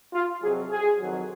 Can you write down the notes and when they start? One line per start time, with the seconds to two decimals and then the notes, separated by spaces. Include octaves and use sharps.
0.13 F4
0.42 F2 C3 F#3 G#4
0.71 G#4
1.00 F2 D#3 F#3